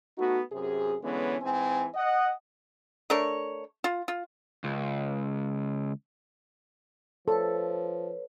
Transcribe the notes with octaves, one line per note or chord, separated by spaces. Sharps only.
A3 B3 D#4 F#4
F#2 C3 G#4
D3 E3 G#3 B3 C#4 C#5
G#2 E3 C4 G#5
D#5 F#5
A3 D4 A#4 C#5
F4
F4
C#2
F3 A4 B4 C#5